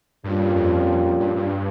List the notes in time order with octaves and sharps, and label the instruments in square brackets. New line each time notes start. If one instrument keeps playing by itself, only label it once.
[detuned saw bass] G2 [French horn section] A#2 G3 C#4 F4
[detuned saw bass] F2
G2
G2